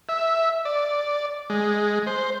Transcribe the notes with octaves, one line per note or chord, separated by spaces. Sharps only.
E5
D5
G#3
C5